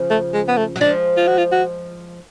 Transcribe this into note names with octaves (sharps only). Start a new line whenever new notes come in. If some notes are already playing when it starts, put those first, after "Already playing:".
Already playing: C#3 F3
A3
G#3
B3
A3
F#3
F3 G#3 D4
F4
F#4
F4
F#4